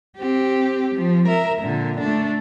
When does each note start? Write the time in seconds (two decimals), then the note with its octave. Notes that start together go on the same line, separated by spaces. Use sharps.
0.17 C4 G4
0.95 F3
1.28 A#4 E5
1.62 A#2 D3
2.00 A3 D4